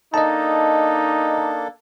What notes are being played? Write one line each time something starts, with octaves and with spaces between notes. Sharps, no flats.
A#3 D4 D#4 A4 D#5 A5